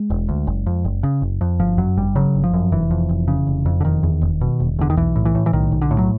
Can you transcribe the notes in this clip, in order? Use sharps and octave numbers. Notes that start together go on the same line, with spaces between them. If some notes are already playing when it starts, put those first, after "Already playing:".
Already playing: G#3
E1
D2
F#1
F2
F#1
C#3
F#1
F2
G1 F3
F#2 F#3
G1 G3
C#3 F#3
G1
F3
F#2
F1 E3
F2
F1
C#3
F1
F2
D3
E1 D#3
E2
E1
B2
E1
E2 D3
D#3
B1 E3
A2
E3
A2
E3
B1 D#3
B1
D3
A2
F#3